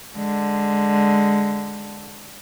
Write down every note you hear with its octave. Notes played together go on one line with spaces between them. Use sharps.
D3 G#3